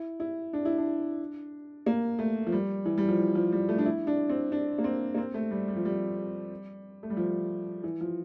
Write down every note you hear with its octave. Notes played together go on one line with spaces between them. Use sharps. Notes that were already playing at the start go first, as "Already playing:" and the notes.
Already playing: E4
E4
D4
E4
D4
A#3
A3
F3
G3
E3
G3
F3
E3
F3
G3
A3
D4
E4
D4
C4
D4
A#3
C4
A#3
C4
A3
G3
G3
F3
G3
A3
G3
F3
E3
F3